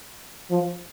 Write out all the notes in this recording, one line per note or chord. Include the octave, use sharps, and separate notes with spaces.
F3